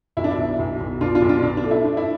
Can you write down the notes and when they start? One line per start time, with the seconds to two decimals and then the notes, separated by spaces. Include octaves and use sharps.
0.17 B1 E4
0.24 D4
0.31 E4
0.38 B2
0.59 B1
0.80 B1
1.01 B2 D4 F4
1.15 D4 F4
1.22 B1
1.29 D4 F4
1.43 B2 D4
1.57 D4
1.64 A3
1.71 E4
1.85 A3 D4
1.97 E4